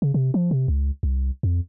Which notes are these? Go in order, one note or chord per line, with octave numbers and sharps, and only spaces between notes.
C#3
C3
F3
C3
C#2
C2
F2